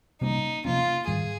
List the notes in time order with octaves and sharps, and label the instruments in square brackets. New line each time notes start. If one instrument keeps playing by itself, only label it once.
[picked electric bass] C3 G3 A#3 C#4 [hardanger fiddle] D#4
[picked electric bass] C3 F3 A#3 C#4 [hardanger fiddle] F4
[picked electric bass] G#2 D#3 G3 [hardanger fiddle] G#4